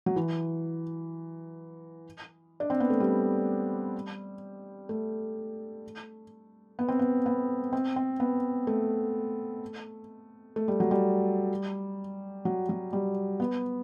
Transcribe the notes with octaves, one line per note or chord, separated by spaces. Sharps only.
F#3
E3
D4
C4
B3
A3
G3
A3
B3
C4
B3
B3
C4
C4
B3
A3
A3
G3
F#3
G3
F#3
F#3
G3
B3